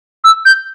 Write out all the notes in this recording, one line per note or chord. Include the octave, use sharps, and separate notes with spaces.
E6
G6